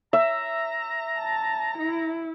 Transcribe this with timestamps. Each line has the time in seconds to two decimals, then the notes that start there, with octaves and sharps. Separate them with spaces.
0.13 E5 A#5
1.20 A5
1.78 E4